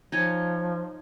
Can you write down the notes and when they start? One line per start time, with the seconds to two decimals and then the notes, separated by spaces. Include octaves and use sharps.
0.12 F3 D#4 C#5 G#5